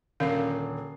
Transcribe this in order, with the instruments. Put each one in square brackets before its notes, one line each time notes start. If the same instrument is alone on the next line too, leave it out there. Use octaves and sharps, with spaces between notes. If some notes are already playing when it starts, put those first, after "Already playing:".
[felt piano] D#1 D3 C7 [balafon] C#4 A#4 F5